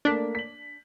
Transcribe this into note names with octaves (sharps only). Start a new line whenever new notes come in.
A3 A#3 D4 B6
B6 F#7